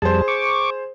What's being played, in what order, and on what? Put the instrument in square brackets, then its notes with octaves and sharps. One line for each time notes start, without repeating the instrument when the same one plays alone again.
[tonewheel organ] F2 G3 A5 [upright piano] G#4 C5
[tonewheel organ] C#6 D6